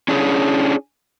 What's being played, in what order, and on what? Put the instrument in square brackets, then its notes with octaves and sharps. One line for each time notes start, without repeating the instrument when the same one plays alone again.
[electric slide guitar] C#4 D4 E4 G#4 B4 C#5